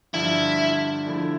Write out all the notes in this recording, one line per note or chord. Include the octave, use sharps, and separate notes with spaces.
G2 D3 F3 E4
D3 F3 A3 E4